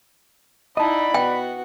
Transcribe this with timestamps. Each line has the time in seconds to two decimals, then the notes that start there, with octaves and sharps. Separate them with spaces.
0.77 D#4 E4 D5 D#5 F#5 A5 B5
1.14 B3 F#4 G5